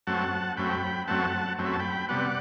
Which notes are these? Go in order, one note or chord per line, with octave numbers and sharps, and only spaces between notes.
F#2 F#3 A3 C4 F#5 A5
F#2 F#3 A3 C4 G5 B5
F#2 F#3 A3 C4 F#5 A5
F#2 F#3 A3 C4
B5
A5
G5 B5
C3 G3 B3 D5 F#5